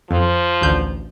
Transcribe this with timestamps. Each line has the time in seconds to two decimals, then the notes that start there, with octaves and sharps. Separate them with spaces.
0.11 F2 F3
0.61 A1 D2 G6